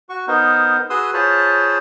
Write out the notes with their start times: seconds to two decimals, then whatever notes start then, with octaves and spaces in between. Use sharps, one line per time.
0.09 F#4 C#6
0.27 B3 D#4 A#4 C5
0.90 F#4 G#4 B4 C6 D#6 E6
1.14 F4 G#4 C5 C#5 A5 B5